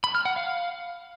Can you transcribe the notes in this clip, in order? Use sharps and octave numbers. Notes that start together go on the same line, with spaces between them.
B5
F6
F#5
F5